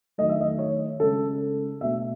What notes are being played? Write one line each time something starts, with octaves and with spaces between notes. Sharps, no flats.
D#3 F#3 A3 D#5
E5
D#5
C#5
C#3 G#3 A4
B2 A3 E5